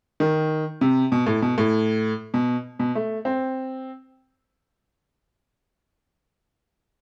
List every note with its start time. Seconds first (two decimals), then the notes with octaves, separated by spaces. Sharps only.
0.20 D#3
0.81 C3
1.12 B2
1.26 A2
1.42 B2
1.58 A2
2.34 B2
2.79 B2
2.95 A3
3.25 C4